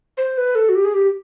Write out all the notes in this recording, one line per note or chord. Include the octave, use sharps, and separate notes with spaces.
C5
B4
A4
F#4
G4
G#4
G4